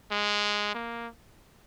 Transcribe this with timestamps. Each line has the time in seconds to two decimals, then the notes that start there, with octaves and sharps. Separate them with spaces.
0.11 G#3
0.74 A#3